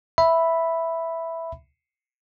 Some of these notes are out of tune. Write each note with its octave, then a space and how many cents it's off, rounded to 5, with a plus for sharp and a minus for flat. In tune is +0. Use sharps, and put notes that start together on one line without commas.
E5 +0 B5 +0